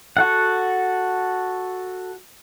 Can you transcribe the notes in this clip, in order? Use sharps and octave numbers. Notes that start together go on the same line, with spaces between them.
F#4 A4 F#5